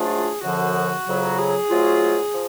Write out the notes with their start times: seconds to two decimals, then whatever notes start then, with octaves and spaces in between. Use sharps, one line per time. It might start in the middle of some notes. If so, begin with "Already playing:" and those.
Already playing: G#2 F#3 A3 D4 F4 G#4
0.43 F#2 D3 F3 F#4
1.06 F2 C#3 F#3
1.38 G#4
1.68 G#2 F#3 A3 F4
2.33 F3